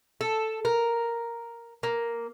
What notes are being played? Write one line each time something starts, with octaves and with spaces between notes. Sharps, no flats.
A4
A#4
A#3